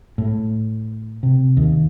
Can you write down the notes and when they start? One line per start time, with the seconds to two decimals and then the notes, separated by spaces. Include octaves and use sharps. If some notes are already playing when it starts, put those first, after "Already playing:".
0.18 A2
1.23 C3
1.57 D#2